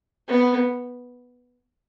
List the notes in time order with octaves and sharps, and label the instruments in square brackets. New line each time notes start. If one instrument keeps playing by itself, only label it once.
[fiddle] B3